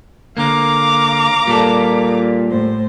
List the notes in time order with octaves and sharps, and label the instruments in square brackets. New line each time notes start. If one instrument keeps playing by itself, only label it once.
[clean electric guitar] D3 A#3 [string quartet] F5 A#5 D6
[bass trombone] A#2 [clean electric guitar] G3 A4
[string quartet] A2 C5